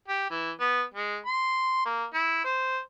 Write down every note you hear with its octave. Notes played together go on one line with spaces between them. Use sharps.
G4
E3
B3
G#3
C6
A#3
E4
C5